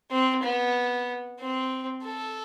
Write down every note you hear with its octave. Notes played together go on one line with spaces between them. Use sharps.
C4
B3
C4
A4